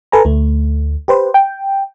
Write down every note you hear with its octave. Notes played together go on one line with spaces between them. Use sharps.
A4 B4 G#5 A#5
D2 A3
G4 B4 C5
G5